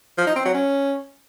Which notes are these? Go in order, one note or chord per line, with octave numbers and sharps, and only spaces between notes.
F3
D#4
C4
F#3
C#4